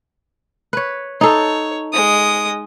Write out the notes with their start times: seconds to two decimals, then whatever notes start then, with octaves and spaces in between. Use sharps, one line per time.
0.73 B4 C#5
1.21 D#4 A4 C#5
1.93 G#3 D#6